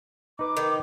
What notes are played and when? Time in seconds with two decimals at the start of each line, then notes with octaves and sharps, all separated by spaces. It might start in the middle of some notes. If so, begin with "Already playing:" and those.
0.39 D#4 B4 D6
0.57 D#3